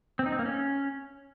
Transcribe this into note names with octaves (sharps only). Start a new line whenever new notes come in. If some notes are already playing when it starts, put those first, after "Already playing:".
C4
D#4
C4
A#3
C#4